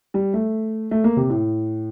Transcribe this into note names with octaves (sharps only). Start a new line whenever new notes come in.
G3
A3
A3
A#3
C3
A2